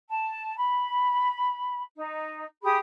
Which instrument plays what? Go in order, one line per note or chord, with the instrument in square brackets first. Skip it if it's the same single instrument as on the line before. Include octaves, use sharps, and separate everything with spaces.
[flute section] A5
B5
D#4
G4 G#4 B5 D#6